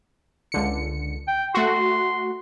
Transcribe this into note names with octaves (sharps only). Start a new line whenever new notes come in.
C#2 D3 C#7
G5
A3 F#4 C6